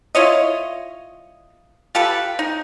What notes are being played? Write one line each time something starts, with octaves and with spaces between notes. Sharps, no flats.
E4 F4 C#5 D#5
F4 G4 A4 B4
D#4